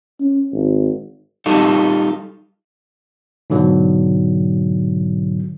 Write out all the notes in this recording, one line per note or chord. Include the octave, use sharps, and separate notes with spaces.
C#4
G#1
G3 D#4 F4 G4 A4
G#2 B2 D3 F#3